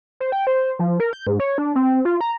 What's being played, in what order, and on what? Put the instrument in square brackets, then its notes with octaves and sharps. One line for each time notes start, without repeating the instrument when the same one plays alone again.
[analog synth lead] C5
G5
C5
F3
A#4
G6
G#2
C#5
D4
C4
F4
A#5